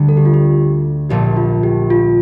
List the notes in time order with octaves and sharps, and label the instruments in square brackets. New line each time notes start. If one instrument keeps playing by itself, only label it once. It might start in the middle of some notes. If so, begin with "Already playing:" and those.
Already playing: [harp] D2 D3 G3 D4
[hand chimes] A4
G4
F4
G4
[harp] A#1 A#2 A3 [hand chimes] G4
[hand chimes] F4
G4
F4